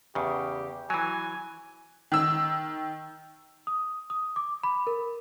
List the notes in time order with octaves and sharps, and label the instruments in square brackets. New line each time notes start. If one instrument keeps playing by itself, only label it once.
[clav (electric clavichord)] E2 C#3 [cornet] G4
[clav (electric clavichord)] E3 F#3 [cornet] G#5
[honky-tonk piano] D#3 E6
[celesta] D#6
D#6
D6
B5
A#4